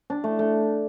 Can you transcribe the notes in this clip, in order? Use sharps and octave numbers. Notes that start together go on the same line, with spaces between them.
D4
A3
A3